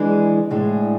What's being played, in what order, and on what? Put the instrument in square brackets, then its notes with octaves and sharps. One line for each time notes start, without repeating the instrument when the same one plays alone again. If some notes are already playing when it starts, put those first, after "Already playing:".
Already playing: [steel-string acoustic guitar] E3 G#3 D4 G#4
A2 G#3 D4 G#4